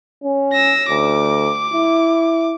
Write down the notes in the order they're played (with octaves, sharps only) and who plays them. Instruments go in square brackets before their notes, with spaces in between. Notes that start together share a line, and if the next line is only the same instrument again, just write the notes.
[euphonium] C#4
[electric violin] E6 A#6
[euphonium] D2 [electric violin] D6
[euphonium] E4